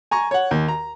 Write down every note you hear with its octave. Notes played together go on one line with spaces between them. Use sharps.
G#5 A#5 C#6
C#5 F#5
D#2
A#5